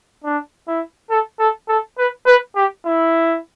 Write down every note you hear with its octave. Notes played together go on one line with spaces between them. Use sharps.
D4
E4
A4
A4
A4
B4
B4
G4
E4